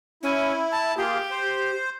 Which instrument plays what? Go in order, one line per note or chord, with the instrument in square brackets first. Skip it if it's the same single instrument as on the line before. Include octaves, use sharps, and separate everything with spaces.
[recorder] C#4 [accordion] E4
[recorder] A5
[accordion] A#3 F4 G#4 [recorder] G4
[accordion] C5